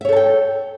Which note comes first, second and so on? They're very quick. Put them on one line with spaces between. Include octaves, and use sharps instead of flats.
E5 C#5 A4 A5 G5